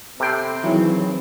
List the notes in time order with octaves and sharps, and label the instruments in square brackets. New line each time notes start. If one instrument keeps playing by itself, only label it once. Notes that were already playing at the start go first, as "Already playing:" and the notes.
[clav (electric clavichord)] C3 G5 [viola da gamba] C4 [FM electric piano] A4 B5 C7
[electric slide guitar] D#3 E3 F#3 [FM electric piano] E4 G#4